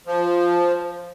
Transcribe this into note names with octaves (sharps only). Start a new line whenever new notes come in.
F3